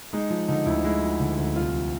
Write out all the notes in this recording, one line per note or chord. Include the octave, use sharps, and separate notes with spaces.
G#3 D#4
F3
D3 D#4
D2 E4
G#3 E4
F3
D3
D2
C2 F4
F3